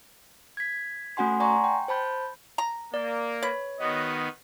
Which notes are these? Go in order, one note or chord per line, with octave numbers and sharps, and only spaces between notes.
G#6 B6
A3 C#4 F#4 F#5 G#5 C6
D5 F#5 G#5 A#5 C6 C#6
G5
C5 A5 B5 G6
A#5
A#3 D5
B4 C#5
D#3 B3 F#4 D#5